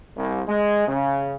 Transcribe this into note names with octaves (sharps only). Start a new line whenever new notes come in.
C2
G#3
C#3